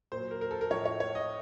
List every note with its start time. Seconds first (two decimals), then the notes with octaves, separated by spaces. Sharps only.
0.12 A#2 F#3 C5
0.31 A#4
0.41 A#4
0.51 A4
0.61 A#4
0.70 A2 F3 C#5
0.85 C#5
1.00 C#5
1.15 D#5